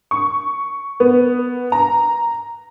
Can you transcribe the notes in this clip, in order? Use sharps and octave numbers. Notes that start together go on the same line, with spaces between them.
C#6
B3
A#5